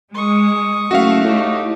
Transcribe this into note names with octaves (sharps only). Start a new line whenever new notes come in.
G#3 C#6 D#6
F#1 A3 F#4 E5 F5
A2 D#4 G4